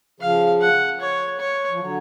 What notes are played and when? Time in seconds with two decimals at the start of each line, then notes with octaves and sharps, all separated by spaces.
0.20 C#3 F3 F5
0.61 F#5
1.00 C#5
1.39 C#5
1.70 F3
1.80 D3 F#3